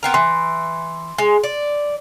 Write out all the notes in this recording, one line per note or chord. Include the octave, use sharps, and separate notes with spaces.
B3 C4 A#4
E3 C6
G#3
D5